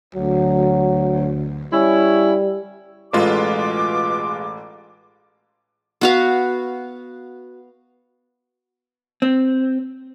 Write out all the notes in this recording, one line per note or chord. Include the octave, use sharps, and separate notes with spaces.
D2 F#3
G3 C#4 E4
A1 B2 G#3 F4 B4 D6
B3 F#4 F5
C4